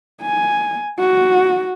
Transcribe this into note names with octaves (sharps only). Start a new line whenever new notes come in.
G#5
F#4